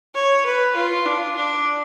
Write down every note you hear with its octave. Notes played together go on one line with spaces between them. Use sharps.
C#5
B4
F4
D4
D4